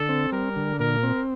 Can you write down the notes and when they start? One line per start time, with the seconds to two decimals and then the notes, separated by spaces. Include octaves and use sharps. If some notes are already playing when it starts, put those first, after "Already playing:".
Already playing: D3 A4
0.09 C4
0.32 G3 A#4
0.56 D3
0.79 A#2 A#4
1.03 C4